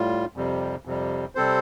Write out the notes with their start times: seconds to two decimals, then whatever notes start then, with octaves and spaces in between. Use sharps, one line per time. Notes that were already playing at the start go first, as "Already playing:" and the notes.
Already playing: A2 G3 F4
0.36 F2 C3 G3
0.85 F2 C3 G3
1.35 C3 G3 C4 A4 C5